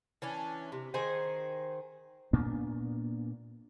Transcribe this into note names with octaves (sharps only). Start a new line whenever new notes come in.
E3 C#4 D4
C3
D#3 G#4 C5 G#5
A#2 A#3 B3 D4